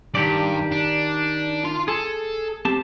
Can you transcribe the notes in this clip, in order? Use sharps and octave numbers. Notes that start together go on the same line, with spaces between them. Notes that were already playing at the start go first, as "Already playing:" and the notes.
G2 D#3 G4 D5
D4
F4 C6
G#4 A4
C4 G4 A5